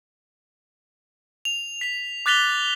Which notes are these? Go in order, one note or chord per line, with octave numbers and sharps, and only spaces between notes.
F7
B6 F7
D6 F#6 A6 B6 F7 G7